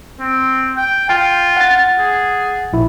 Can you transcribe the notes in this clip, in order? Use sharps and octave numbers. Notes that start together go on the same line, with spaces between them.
C4
G5
F4 G5
F#5 A6
G#4
A#1 E4